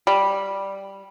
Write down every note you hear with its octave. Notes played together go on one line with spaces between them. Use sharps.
G3